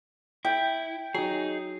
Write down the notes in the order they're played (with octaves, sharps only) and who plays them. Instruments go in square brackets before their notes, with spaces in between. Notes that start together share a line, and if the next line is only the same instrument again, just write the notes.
[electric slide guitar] E4 [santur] G5
[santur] F#3 [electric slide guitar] D#4 G#4